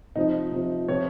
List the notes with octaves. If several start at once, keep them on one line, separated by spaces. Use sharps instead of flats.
C3 F3 D#4
C3 F3
C3 F3 C#5